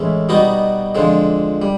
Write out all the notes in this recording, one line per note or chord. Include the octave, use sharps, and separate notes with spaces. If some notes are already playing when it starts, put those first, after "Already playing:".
Already playing: A2 E3 G#3 C#4 E4
B2 G3 B3 D#4 F#4
F2 D3 F3 G#3
G3